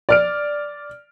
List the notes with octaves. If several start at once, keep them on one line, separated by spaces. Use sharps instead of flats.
D5 F6 D7